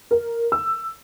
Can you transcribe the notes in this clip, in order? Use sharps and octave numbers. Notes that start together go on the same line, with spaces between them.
A#4
E6